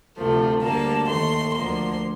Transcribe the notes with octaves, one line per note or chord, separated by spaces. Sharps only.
D2 C3 F3 A3
D2 D3 G3 A#3 A5
D#2 D#3 A3 C6
D2 D3 F3 A#3 C6